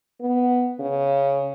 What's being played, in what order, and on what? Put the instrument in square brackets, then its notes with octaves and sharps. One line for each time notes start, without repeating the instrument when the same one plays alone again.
[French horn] B3
C#3